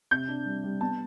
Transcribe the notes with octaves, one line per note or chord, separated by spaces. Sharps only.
C3 G6
D4
G3
G3
B3 A5